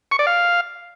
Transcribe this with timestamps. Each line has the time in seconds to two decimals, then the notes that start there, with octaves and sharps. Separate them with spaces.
0.12 C#6
0.19 D5
0.27 F5